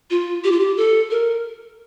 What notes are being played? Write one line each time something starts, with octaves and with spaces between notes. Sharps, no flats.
F4
G4
F4
G4
A4
A#4